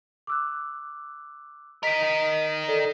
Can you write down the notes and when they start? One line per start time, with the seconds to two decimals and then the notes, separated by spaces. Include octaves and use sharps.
0.27 D6 E6 F#6
1.83 D#4 A#4 D#5 B6 D7
2.68 A4 D5